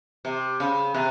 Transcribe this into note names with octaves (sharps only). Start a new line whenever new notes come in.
C3
C#3
C3